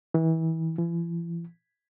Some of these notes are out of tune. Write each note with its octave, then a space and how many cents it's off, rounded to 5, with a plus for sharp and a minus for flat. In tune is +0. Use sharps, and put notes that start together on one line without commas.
E3 -30
E3 +40